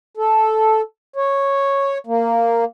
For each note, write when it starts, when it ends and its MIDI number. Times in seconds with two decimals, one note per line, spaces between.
0.17 0.81 69
1.16 1.98 73
2.07 2.64 58